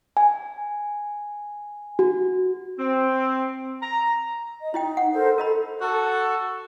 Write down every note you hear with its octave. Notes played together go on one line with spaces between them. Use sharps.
G#5
F#4
C4
A#5
D#5
D#4 E4 D#5 G5
F#5
A4 A#4 C5
A4 A#4 D#5 B5
F#4 A4